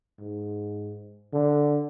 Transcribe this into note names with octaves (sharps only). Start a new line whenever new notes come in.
G#2
D3